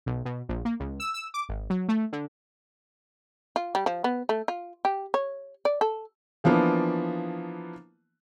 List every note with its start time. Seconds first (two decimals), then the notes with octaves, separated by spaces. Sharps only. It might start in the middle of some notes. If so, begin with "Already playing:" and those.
0.06 B1
0.25 B2
0.49 A#1
0.65 A#3
0.80 C#2
1.00 E6
1.14 E6
1.34 D6
1.49 G#1
1.70 F#3
1.88 A3
2.13 D3
3.56 F4
3.75 G3
3.86 F3
4.04 B3
4.29 A3
4.48 F4
4.85 G4
5.14 C#5
5.65 D5
5.81 A4
6.44 E3 F3 A#3 B3 D4